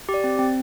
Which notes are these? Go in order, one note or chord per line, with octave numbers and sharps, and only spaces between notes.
G4
D5
C4
C4